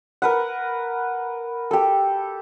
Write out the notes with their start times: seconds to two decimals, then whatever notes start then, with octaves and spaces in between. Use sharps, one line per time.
0.22 A#4 B4 F#5
1.71 G4 A4